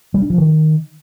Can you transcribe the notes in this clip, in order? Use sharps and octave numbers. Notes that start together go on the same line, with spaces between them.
G3
D4
F3
D#3